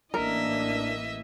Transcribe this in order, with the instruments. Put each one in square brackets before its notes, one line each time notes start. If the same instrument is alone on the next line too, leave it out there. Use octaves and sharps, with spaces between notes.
[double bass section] A1 E3 A#3 [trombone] D4 [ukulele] A#4 [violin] D#5 E5